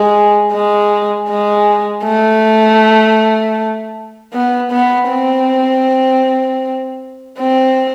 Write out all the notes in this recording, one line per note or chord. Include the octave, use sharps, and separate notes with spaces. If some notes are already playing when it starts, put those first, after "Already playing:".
Already playing: G#3
G#3
G#3
A3
B3
B3
C4
C4